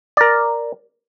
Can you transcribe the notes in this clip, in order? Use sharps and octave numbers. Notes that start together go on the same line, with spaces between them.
A#4 D5